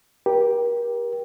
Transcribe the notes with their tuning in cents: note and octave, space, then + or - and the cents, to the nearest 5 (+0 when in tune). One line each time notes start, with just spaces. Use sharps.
G4 +0 A#4 +35